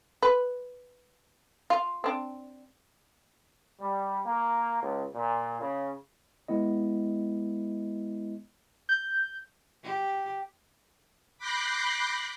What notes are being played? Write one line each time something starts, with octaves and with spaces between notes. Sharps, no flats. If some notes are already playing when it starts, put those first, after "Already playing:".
B4
F4
C4 D4
G3
A#3
C#2
A#2
C#3
G#3 B3 E4 D#5
G6
G4
B5 D6 F#6 G6 A#6 C7